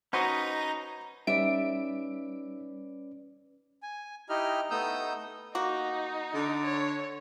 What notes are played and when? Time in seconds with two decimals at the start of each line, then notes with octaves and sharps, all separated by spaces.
0.13 C#4 D#4 F#4 B4 C5 D#5 F#5 A#5
1.27 G3 C#4 D#4 B4 D5 E5 D7
3.83 G#5
4.29 D#4 E4 G4 D#5 F6
4.71 A3 B3 D#4 D#6 E6 G6
5.55 A#3 D#4 F#4
6.34 D3
6.64 C#5